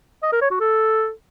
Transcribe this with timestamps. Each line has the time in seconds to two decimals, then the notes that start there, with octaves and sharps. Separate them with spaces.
0.23 D#5
0.32 A#4
0.41 C#5
0.51 F#4
0.60 A4